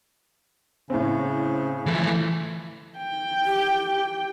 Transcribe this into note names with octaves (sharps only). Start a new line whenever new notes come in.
A2 C#3 C4
E3 F3 A3
G5
G4